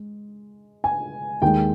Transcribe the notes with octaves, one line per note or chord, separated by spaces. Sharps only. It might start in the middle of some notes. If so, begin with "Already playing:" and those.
Already playing: G#3
G#5
D#2 D#3 G#3 G5